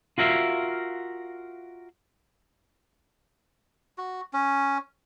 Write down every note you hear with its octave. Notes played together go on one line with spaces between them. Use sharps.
F4 F#4 A#4 E5 F5
F#4
C#4